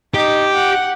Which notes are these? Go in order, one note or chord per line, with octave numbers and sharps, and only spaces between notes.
D#4 G4
F#5